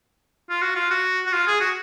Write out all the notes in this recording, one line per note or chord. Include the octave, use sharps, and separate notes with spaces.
F4
F#4
F4
F#4
F#4
F4
G#4
F#4